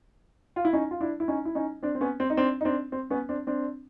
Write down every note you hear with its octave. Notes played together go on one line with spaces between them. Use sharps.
F4
E4
C#4 D#4
F4
D4 E4
E4
C#4 D#4
E4
C#4 D#4
C4 D4
C4
B3 C#4
C4
D#4
C4 D4
D#4
C4 D4
C4
B3 C#4
C4 D4
C4 D4